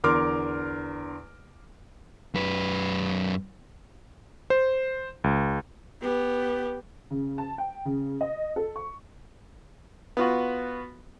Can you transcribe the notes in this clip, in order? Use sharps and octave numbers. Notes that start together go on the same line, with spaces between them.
E2 D3 A#4 C6 D6 F6
F#2 B4
C5
C#2
B3 G4
C#3
A5
G5
C#3
D#5
A4
C#6
B3 F4 F#4